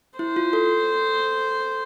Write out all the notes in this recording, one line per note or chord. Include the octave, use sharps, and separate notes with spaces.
E4 C5
F4
A4